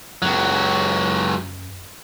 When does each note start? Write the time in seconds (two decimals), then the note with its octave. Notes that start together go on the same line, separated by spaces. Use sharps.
0.22 C#2 F#2 F#3